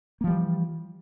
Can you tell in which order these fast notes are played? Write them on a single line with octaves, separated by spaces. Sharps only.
A#3 F3 G3 E3